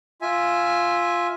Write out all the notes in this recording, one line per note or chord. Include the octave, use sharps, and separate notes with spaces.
F4 E5 G#5